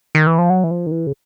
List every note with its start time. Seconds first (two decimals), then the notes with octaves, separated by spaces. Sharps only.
0.15 D#3
0.27 E3
0.39 F3
0.50 F#3
0.64 E3
0.71 F3
0.87 D#3
0.91 E3
1.07 C#3